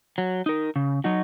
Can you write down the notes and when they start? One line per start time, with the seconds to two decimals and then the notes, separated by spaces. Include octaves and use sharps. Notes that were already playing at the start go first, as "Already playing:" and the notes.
0.18 F#3
0.46 D#4 A#4
0.76 C#3
1.04 F#3 D#4 F#4